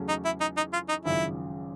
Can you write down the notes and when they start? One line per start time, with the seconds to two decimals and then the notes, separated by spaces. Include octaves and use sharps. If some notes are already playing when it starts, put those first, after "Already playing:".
Already playing: E2 C#3 F#3 A3 C#4
0.09 D#4
0.25 E4
0.41 D#4
0.57 D#4
0.73 F4
0.89 D#4
1.05 G#1 F#2 C#3 F3 E4